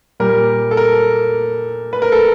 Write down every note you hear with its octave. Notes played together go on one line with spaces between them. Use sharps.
A#2 G3 A#4
A4
A#4
B4
A#4
A4